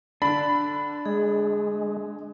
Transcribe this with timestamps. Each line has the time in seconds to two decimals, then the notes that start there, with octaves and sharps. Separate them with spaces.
0.22 D3 D4 B5
1.06 G#3 G#4